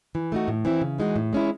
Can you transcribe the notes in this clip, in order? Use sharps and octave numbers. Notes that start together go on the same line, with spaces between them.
E3
A3 D#4 F#4
A2
E3 C4 E4
C#3
E3 G#3 D#4 F#4
A2
G#3 C#4 E4